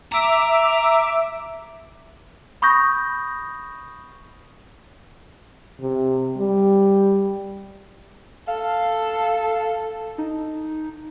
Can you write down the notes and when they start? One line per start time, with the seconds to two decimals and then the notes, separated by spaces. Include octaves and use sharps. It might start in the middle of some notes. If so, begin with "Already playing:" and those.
0.12 E5 A#5 D6
2.62 B5 C#6 D#6 G6 A#6
5.81 C3
6.37 G3
8.47 A4 F5
10.18 D#4